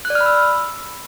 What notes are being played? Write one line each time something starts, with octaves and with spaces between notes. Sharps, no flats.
F#6
D5
F6
B5
E6